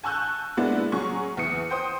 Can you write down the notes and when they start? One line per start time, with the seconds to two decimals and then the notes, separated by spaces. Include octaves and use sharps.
0.04 G#5 A5 C#6 E6 F#6 G6
0.57 G#3 A#3 B3 D4 E4
0.92 F#3 C#4 G#4 C#6
1.37 E2 D#6 C#7
1.70 C5 G5 C6 D#6